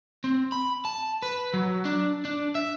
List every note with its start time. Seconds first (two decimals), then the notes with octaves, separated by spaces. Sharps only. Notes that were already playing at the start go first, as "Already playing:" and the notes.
0.24 C4
0.52 B5
0.85 A5
1.22 B4
1.54 F#3
1.85 D4
2.25 D4
2.55 E5